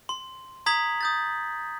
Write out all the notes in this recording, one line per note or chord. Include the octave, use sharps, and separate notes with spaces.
C6
A#5 D#6 G#6 B6 F#7
D#6 G6 A6